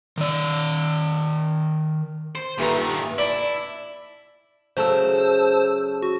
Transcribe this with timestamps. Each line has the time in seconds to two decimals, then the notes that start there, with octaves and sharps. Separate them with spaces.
0.18 D#3 D5
2.35 C5
2.58 G2 A#2 D#3 A3 A#5
3.18 D4 E4 D5
4.77 C#3 F#3 A3 C5 A5 E6
6.02 F#4